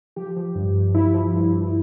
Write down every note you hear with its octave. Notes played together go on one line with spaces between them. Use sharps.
F3 G4
F3
G2
G2
F3 E4
F3
G2
G2